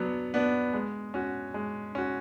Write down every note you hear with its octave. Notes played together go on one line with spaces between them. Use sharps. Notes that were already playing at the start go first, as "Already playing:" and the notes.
Already playing: F#3 B3 D4
B3 D4
G#3
C#4 F#4
G#3
C#4 F#4